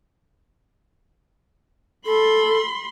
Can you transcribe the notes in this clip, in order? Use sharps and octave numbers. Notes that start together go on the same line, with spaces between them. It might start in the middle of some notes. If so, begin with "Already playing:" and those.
A4 B5 C6